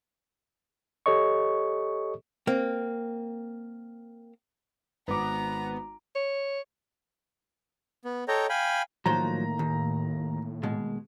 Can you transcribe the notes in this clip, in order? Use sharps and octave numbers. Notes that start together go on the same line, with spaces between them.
G4 A4 C#5 D#5 C#6
A#3 C4
G#1 B3 A#5 D6
C#5
B3
A4 C#5 D#5 G5 A#5
F5 G5 G#5 B5
A2 D#3 F3 F#3 A3 A#3 C5 A#5
D#2
B2 G#3